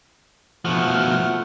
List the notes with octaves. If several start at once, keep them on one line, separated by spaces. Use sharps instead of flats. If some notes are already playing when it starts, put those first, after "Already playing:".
B2 F3 A3 F#5 F6